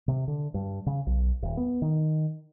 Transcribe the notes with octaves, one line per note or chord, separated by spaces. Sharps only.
C3
D3
G2
C#3
B1
D#1
B3
D#3